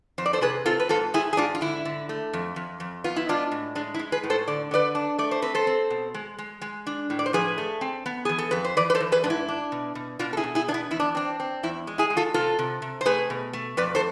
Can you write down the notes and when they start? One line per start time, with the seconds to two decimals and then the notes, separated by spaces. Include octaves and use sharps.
0.18 F2 C5
0.26 D5
0.33 A4 C5
0.41 C3 G#4 B4
0.66 C4 F4 A4
0.80 B4
0.89 G#2 F4 A4
1.14 G#2 E4 G#4
1.33 G#4
1.37 G#2 D4 F4
1.55 F4
1.61 D3 E4
1.85 D3
2.09 A3
2.33 F2
2.56 F2
2.80 F2
3.04 B3 F4
3.16 E4
3.29 G#3 D4 F4
3.52 A2
3.75 G#3 D4
3.94 E4
3.99 G#3
4.12 G#4 B4
4.24 A2
4.30 A4 C5
4.48 D3 D5
4.71 D3 B4 D5
4.95 D4
5.18 A3 D5
5.31 C5
5.42 C4 B4
5.55 A4 C5
5.67 C4
5.90 B2
6.14 G#3
6.38 G#3
6.62 G#3
6.87 D4
7.10 A2
7.19 D5
7.26 C5
7.33 F3 G#4 B4
7.58 A3
7.81 C4
8.06 B3
8.25 E3 G#4
8.38 A4
8.51 F2 B4
8.64 C5
8.77 E3 B4 D5
8.90 B4
8.95 A4 C5
9.00 E3
9.12 G#4 B4
9.24 G#2 D4
9.30 E4
9.48 D4
9.72 B2
9.95 B2
10.19 B2 D4 F4
10.33 A4
10.37 E4 G#4
10.44 B2
10.55 E4 G#4
10.68 B3 D4
10.74 E4
10.91 E2 E4
11.00 D4
11.15 C4 D4
11.40 C4
11.63 E2 E4
11.87 G#3
11.98 E4 G#4
12.10 G#3
12.17 F4 A4
12.34 C3 F4 A4
12.59 C3
12.82 C3
13.01 C5
13.06 A3 G#4 B4
13.30 B2
13.53 A3
13.77 F2 B4 D5
13.95 A4 C5